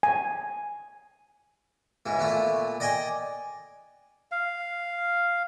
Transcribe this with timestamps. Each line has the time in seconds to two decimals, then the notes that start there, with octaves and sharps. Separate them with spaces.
0.03 G#5
2.06 C#2 G#2 E3
2.19 A#2 A3 B3
2.80 D5 D#5 G5 G#5
4.32 F5